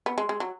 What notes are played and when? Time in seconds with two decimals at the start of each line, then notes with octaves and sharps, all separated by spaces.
0.06 B3
0.18 G#3
0.29 G#3
0.40 F#3